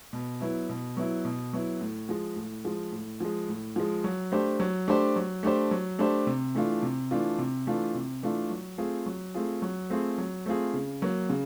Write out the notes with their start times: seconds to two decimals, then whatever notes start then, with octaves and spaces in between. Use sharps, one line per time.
0.13 B2
0.41 F#3 B3 E4
0.69 B2
0.97 F#3 B3 E4
1.25 B2
1.53 F#3 B3 E4
1.81 A2
2.09 F3 G#3
2.36 A2
2.65 F3 G#3
2.92 A2
3.20 F3 G#3
3.48 A2
3.76 F3 G#3
4.04 F#3
4.32 A3 D4 G4 C5
4.60 F#3
4.88 A3 D4 G4 C5
5.16 F#3
5.43 A3 D4 G4 C5
5.71 F#3
5.99 A3 D4 G4 C5
6.27 C3
6.55 E3 A3 D4 F4
6.83 C3
7.11 E3 A3 D4 F4
7.39 C3
7.67 E3 A3 D4 F4
7.95 C3
8.22 E3 A3 D4 F4
8.50 F#3
8.78 A3 C4 F4 G#4
9.06 F#3
9.34 A3 C4 F4 G#4
9.62 F#3
9.90 A3 C4 F4 G#4
10.18 F#3
10.46 A3 C4 F4 G#4
10.74 C#3
11.02 F#3 A#3
11.29 C#3